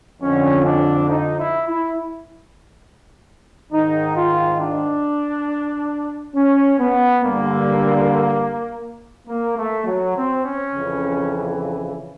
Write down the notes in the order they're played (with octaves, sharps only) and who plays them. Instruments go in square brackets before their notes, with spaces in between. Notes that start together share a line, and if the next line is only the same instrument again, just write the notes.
[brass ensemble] F2 D3 C#4
D4
D#4
E4
E4
G#2 D#3 D#4
F4
D4
C#4
B3
G2 D3 A#3
A#3
A3
F#3
C4
C#4
F2 C#3 E3